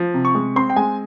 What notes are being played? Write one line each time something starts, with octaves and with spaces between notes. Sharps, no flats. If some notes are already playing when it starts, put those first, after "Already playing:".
Already playing: F3
C3
C#6
G#3
C4 C6
G5
G#3 G#5